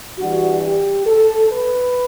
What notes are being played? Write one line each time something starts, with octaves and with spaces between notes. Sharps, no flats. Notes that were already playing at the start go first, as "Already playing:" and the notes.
E3 G3 D4 F#4
G4
A4
B4